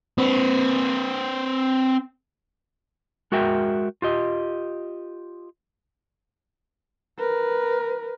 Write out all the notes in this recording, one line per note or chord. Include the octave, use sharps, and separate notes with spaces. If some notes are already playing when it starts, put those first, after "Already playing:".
C4 B4
G#3 F#4 A#4 E5 G5
F4 G4 D#5
A#4 B4